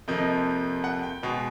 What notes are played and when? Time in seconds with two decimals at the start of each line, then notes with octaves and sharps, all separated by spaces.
0.08 F2 C3 F3 A#3 D#5
0.84 F#5
1.03 G5
1.23 B2 G#3 B3